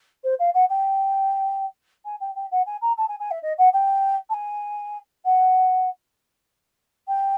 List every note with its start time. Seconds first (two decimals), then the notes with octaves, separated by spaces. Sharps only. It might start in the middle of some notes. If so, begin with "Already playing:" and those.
0.24 C5
0.39 F5
0.54 F#5
0.70 G5
2.05 G#5
2.21 G5
2.36 G5
2.52 F#5
2.66 G#5
2.82 A#5
2.98 A5
3.09 G#5
3.20 G#5
3.31 E5
3.43 D#5
3.58 F#5
3.73 G5
4.30 A5
4.34 G#5
5.25 F#5
7.08 G5